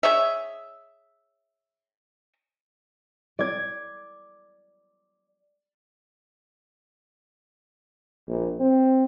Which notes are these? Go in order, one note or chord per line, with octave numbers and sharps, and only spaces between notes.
G#4 C#5 D#5 E5
D5 G#6
A#1
C4